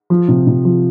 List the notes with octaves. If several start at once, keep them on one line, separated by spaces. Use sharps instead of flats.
F3
C3
C3
F3